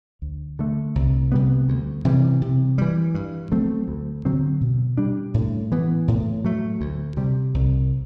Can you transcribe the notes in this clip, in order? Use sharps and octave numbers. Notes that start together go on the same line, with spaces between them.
D2
D3 A3
C2
C3 G3 B3
D2
C3 E3 G3
C3
E3 G3
G2
F#3 A3 C4
D2
D3 F#3 C4
B2
G3 D4
A2
E3 B3
A2
F#3 A3
D2
C3 G3
C2